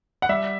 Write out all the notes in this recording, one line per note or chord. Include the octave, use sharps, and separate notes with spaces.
F#5
G3 E5